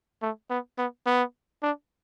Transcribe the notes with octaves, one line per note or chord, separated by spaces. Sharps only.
A3
B3
B3
B3
D4